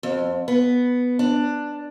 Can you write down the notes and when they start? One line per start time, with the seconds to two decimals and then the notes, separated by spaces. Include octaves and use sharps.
0.03 F2
0.48 B3
1.19 D4